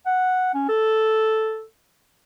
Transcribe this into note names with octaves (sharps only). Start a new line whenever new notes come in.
F#5
C#4
A4